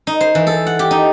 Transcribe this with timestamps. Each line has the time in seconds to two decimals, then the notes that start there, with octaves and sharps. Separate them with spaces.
0.07 D#4
0.21 C5
0.35 E3
0.47 A4
0.67 F#5
0.79 G4
0.91 D#4